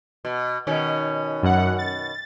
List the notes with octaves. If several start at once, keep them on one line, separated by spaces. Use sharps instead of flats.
B2
B2 D#3 C#4
F#2 F#5
A6